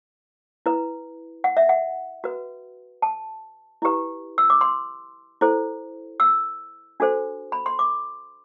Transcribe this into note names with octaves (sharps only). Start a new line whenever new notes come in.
E4 B4
F#5
E5
F#5
F#4 B4
A5
E4 G4 B4
E6
D6
C6
E4 A4 C5
E6
D4 F#4 A4 C5
B5
C6
D6